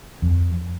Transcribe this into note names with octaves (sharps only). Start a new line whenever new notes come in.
F2